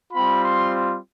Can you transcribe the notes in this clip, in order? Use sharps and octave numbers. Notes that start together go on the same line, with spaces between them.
G3 C4 F4 B5
C6